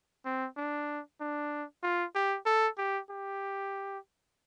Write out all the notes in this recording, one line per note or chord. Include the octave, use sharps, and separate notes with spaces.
C4
D4
D4
F4
G4
A4
G4
G4